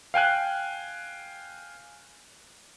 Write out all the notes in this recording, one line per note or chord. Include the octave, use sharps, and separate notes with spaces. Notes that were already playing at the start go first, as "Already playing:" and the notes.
F5 G5 G#5 F#6